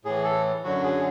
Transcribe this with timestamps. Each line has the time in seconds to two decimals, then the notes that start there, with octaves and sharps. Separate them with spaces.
0.05 A2 E3 G#4
0.25 A4
0.64 F#2 D3 F#3 F#4
0.84 G#4